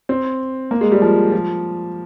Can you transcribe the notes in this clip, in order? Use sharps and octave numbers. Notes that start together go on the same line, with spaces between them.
C4
A#3
G#3
G3
F3
F3